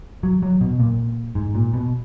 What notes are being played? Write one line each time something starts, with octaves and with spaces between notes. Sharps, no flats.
F#3
F#3
B2
A#2
G#2
A#2
B2